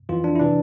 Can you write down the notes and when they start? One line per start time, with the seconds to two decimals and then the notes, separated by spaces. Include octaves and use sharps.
0.09 F2 E3 F4
0.24 D4
0.36 E4
0.39 C3 E3 D4